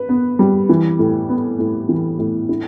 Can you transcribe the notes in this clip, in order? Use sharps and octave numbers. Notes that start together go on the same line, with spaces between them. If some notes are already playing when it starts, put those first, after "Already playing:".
Already playing: B4
B3
G3
E3
A2
B3
A2
E3
A2
E4